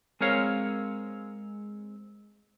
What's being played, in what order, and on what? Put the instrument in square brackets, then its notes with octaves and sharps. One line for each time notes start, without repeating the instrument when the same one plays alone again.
[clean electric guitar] G#3 C4 A#4 C#5 F5